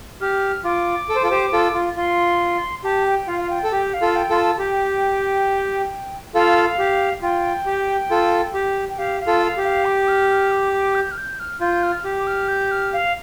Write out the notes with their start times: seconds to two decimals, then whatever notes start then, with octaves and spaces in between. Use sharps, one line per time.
0.21 G4 F6
0.64 F4 D6
1.09 A4
1.15 C5
1.23 F4 A4
1.31 G4 C5
1.53 F4 A4
1.74 F4
1.96 F4 C6
2.84 G4 A5
3.06 G5
3.27 F4 F5
3.41 F5
3.50 G5
3.64 A4
3.72 G4 G5
3.94 F5
4.01 F4 A4
4.16 G5
4.30 F4 A4 C6
4.37 A5
4.59 G4 G5
6.35 F4 A4 F5
6.79 G4
7.22 F4 G5
7.66 G4
8.10 F4 A4
8.54 G4
8.90 G5
8.98 G4 F5
9.21 F5
9.27 F4 A4
9.42 F5
9.57 G4
9.64 F5
9.85 D6
10.08 F6
10.30 F6
10.51 D6
10.73 D6
10.95 G6
11.12 F6
11.18 G6
11.40 F6
11.61 F4 G6
11.83 F6
12.05 G4
12.19 D6
12.27 F6
12.48 G6
12.71 F6
12.93 F5